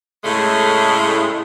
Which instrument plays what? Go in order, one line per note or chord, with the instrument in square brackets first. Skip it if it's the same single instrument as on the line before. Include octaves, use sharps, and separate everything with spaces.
[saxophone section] A2 C#3 G#3 A3